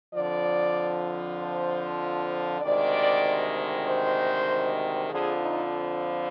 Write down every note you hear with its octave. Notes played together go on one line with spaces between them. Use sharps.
F2 D3 F3 D5
C5
D2 C3 D#3 G#3 D5
C5
F2 D3 F3 G#4
D#4